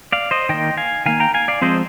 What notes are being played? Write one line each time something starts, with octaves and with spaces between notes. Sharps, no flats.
D5 F5
C5 D#5
D#3 A#3 D#5 G5
F5 G#5
D#3 A#3 F5 G#5
G5 A#5
F5 G#5
D5 F5
F3 G#3 C4 C5 D#5